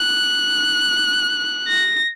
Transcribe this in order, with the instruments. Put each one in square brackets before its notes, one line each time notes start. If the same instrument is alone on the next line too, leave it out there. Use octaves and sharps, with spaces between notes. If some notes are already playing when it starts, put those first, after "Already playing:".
Already playing: [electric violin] F#6
A#6